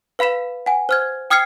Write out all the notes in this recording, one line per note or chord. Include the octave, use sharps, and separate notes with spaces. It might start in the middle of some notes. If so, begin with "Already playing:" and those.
B4 F5 B5 B6 E7
F#5 G#5
C5 F6 G#6
G5 D#6 F6 G#6 C7 C#7